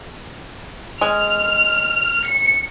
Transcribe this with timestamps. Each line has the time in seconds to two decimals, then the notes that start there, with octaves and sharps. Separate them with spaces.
1.01 G#3 F6
2.26 C#7